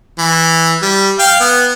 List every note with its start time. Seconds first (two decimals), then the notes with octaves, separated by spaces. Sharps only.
0.19 E3
0.82 G3
1.19 F5 G5
1.40 B3